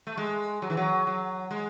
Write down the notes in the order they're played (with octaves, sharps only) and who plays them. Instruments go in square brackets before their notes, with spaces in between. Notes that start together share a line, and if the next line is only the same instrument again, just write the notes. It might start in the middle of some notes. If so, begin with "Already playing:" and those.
[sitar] A3
G#3
F#3
E3
F#3
F#3
G#3